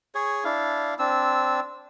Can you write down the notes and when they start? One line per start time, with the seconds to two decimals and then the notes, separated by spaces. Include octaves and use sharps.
0.15 G#4 C#5
0.44 D4 E4 F5
0.99 C4 D4 E6